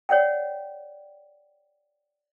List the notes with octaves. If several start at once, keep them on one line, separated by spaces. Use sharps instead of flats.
C#5 D5 F#5 G5